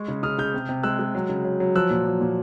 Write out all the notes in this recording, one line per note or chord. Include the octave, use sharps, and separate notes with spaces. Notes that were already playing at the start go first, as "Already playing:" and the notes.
Already playing: G#3 C#6
C#3
C#3 D#6 F6
C#3 F6 G6
C3
C3
G#3 E6 F#6
G#3
F#3
C#3
F#3
F#3
F3 E6 F#6
A#2
F3
A#2